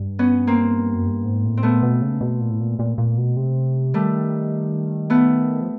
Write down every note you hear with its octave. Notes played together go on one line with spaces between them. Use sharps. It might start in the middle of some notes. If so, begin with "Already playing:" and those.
Already playing: G2
B3 C#4
A#3 C4
F#2
G2
G#2
A2
C4
A#2 A3 B3
B2
C#3
B2
A#2
A2
A#2
A#2
A#2
B2
C3
D#3 G3 A3
A3 B3
F3